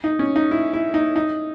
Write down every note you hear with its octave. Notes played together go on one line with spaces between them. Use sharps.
D#4
C#4
D#4
E4
E4
D#4
D#4